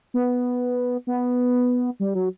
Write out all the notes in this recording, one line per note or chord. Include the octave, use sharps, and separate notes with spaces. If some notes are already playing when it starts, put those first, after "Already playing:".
B3
B3
G3
F#3